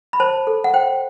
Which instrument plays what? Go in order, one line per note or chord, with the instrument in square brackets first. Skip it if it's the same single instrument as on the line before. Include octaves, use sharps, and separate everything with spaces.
[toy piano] B5
C5 A5
A4
F#5
C5 G5